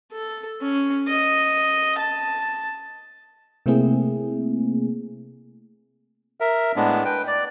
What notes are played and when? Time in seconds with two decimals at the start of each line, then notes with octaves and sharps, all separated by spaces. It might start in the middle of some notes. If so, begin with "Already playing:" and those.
0.12 A4
0.61 C#4
1.07 D#5
1.98 A5
3.66 C3 A3 A#3 C4 E4 G#4
6.40 A#4 E5
6.76 A2 G#3 B3 D4
7.05 B4 G5
7.27 D5